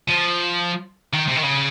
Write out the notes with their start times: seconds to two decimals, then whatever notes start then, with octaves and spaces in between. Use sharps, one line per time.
0.08 F3
1.13 D#3
1.28 C3
1.36 D#3
1.43 C#3